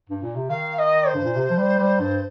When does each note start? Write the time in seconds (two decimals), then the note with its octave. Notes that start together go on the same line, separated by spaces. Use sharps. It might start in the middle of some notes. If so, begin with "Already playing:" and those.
0.09 G2
0.23 A#2
0.36 C3
0.50 D#3 F5
0.79 D#5
1.08 C5
1.14 G2
1.25 A#2
1.36 C3
1.50 F3
1.57 G3
1.79 G3
2.00 G2